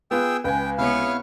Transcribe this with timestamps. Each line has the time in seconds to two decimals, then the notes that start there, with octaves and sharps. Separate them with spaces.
0.11 B3 F4 G#4 G5 E6
0.44 C#2 B4 G5 G#5
0.78 C3 B3 E4 C#5 F5